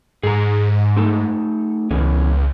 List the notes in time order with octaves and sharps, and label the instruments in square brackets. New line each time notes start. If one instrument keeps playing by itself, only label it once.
[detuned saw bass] G#2 [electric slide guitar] G#4 A#5
[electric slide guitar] A3 D#4 A4
[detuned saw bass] C#2 [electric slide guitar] B2 E3 C#4